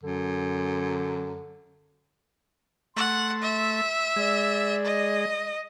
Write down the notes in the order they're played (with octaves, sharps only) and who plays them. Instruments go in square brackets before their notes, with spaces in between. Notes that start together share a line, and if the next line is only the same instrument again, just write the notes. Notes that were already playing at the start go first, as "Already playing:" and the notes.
[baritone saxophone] F#2 [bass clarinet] D3
[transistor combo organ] A3 [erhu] F#5 [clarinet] C6
[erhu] E5
[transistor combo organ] G#3 [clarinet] D5
[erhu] D#5